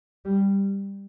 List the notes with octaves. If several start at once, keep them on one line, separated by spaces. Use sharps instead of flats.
G3